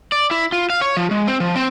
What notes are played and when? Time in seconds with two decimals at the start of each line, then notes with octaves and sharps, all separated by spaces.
0.12 D5
0.31 E4
0.52 F4
0.70 F5
0.81 C#5
0.97 F3
1.11 G#3
1.28 C4
1.40 F3
1.56 C4